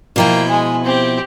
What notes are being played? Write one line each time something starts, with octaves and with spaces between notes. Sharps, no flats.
B2 F3 A#3 E4 G5
G#3 G#5
C4 G4